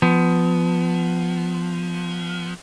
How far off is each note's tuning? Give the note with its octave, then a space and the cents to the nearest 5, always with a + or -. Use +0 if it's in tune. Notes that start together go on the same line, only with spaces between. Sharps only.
F3 +0 B3 +20